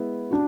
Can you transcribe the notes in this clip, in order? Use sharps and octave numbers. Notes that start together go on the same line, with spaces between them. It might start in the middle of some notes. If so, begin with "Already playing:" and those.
Already playing: G#3 B3 E4
D4 F#4